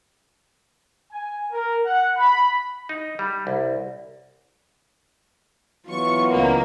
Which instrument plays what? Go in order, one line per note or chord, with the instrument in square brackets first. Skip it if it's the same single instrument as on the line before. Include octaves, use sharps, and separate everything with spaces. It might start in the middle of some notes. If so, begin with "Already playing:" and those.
[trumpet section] G#5
A#4
F#5
B5
[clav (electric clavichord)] D#4
G3
C2
[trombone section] E3 F#3 B3 [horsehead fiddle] F4 [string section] C#6
[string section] C#2 A#3